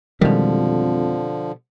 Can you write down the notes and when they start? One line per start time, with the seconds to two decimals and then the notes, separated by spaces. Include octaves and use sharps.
0.21 F2 B2 D3 D#3 F3 G3 G#3